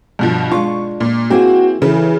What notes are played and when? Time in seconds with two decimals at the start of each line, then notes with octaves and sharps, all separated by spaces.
0.19 G2 B2 F3
0.51 G#3 D4 F4 C#6
1.00 A#2
1.30 A#3 C4 E4 F#4 G#4
1.82 C#3 E3 A4 B4